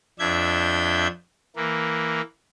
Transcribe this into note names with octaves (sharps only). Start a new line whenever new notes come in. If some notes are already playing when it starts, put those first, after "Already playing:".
F2 D4 E5 G6 G#6
E3 A#3